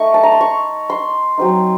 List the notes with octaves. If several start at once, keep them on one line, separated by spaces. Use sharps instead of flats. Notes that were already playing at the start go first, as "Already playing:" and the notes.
Already playing: A3 D#4 D#5 C#6
A5
A#5
C6
C#6
C6
F#3 C4 D#4